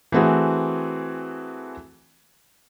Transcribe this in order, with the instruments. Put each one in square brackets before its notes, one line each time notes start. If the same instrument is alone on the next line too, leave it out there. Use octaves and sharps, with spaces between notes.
[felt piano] E3 A3 C4 F#4 G#4